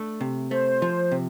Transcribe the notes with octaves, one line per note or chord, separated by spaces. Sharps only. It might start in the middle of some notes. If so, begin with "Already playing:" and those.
Already playing: A3 D4
C3
A3 C5
F3
C3